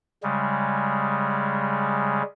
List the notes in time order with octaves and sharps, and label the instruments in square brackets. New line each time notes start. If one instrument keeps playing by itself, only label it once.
[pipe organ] C#3 G3 G#3